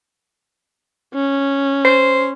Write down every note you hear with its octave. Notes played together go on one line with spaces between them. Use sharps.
C#4
C5